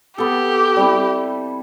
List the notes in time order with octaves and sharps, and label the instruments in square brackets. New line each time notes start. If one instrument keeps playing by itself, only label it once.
[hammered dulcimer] B3 A4 [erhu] G4
[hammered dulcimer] G3 C4 E4